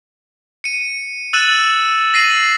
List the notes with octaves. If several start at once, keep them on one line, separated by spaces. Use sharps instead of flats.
C#7 D#7
E6 F#6 A6 D#7 E7 F#7
A#6 C7 D#7 F#7